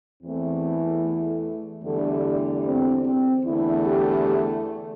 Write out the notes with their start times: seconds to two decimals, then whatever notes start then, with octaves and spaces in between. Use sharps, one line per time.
0.23 E2 E3 A3 C4
1.04 A3
1.84 E2 D3 G3 A3
2.65 C4
3.06 C4
3.45 E2 D3 A3 E4
3.86 G4
4.26 A4